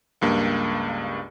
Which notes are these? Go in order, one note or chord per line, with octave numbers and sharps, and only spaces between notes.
C#2 G2 A#3